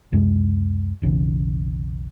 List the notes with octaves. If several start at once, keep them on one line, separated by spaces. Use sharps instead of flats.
C#2 F#2 C3 G#3
F1 B1 C#3 E3